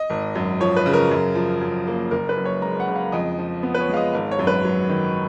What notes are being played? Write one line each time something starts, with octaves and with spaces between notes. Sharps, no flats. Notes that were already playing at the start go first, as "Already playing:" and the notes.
Already playing: D#5
G#1
F#2
F3 C#5
B4
C#3
A#4
F#2
F3
F#2
A#3
F#1 A#4
B4
F#2
C#5
G#3 A#5
F#5
C#3
F5
F2 D#5
F3
B3
B4
C#5
G#3 F5
D#5
G#1 F5
C#5
F#2
B4
F#3
D#3